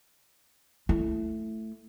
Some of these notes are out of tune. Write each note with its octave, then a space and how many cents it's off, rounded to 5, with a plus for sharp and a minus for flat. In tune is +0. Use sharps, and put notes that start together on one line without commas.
A3 +0 E4 +10